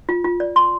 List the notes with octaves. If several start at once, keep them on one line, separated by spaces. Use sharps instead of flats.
F4
F4
D5
C6